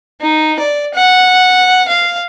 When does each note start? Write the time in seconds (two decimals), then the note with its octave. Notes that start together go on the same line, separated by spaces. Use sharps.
0.21 D#4
0.59 D5
0.94 F#5
1.88 F5